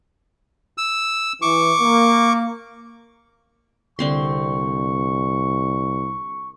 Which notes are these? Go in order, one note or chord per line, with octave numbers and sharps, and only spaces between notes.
E6
E3 C#6 D6
A#3
C2 D3 C4 C6 C#6